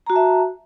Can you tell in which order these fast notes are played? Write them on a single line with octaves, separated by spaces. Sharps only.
A#5 F#4 A5 E5